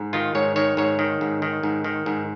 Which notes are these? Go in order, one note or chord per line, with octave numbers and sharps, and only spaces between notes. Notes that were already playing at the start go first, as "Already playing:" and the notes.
Already playing: G#2
D#3 F4
G#2 C#5
D#3 C#5
G#2 C#5
D#3
G#2
D#3
G#2
D#3
G#2